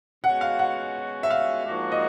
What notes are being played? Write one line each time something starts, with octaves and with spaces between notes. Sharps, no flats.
B2 G#3 C#4 F#4 F#5
F5
F#5
E5
F5
G#2 F3 A#3 D4 F#4
D#5